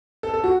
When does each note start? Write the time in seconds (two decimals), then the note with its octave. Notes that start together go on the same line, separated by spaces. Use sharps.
0.23 A4
0.34 A4
0.44 F#4